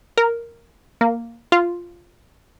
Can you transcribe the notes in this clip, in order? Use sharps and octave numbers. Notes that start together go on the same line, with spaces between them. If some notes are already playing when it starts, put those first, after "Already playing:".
A#4
A#3
F4